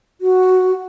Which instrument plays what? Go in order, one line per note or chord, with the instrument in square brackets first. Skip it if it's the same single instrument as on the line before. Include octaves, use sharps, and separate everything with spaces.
[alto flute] F#4